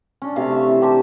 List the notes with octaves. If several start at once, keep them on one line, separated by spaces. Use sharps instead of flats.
C#4 D4
C3 A3 F5
E5
E3
G4 A#4 C5 A5